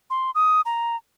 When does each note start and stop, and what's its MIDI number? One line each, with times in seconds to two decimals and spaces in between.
0.10 0.31 84
0.35 0.61 87
0.65 0.96 82